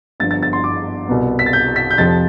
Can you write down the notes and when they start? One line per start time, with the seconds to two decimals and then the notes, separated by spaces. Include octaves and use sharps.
0.20 G1 G2 F3 B3 A6
0.31 A6
0.43 A6
0.53 C6
0.64 D6
1.08 C2 B2 B3
1.39 B6
1.46 A6
1.53 G6
1.76 B6
1.91 G6
1.98 F1 F2 C3 F3 A6